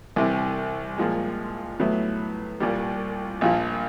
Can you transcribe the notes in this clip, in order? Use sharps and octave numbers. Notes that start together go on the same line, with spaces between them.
C2 C3 E3
A#2 F3 G#3
A2 F#3 B3 E4
C2 A#2 G3
A#1 A#2 F3